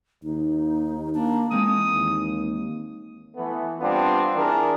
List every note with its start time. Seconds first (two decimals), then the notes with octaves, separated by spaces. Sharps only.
0.24 D#2 D#4
1.15 A#3 D4
1.51 E3 G#3 A#3 C4 D#6
1.93 D#2
3.36 E3 A3 B3
3.81 G3 B3 C4 D4 F4
4.36 E3 D4 G#4 A#4